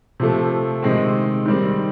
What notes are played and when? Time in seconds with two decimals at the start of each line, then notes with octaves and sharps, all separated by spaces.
0.20 C3 F3 A3
0.82 C3 D#3 G#3 C4
1.46 D#3 G3 C4